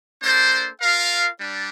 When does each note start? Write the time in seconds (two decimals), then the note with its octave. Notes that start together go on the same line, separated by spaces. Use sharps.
0.22 A#3 D4 A4 C5
0.81 F4 A#4 F5
1.38 G3 D4